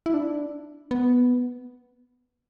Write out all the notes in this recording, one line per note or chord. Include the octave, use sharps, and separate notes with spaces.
E4
D4
B3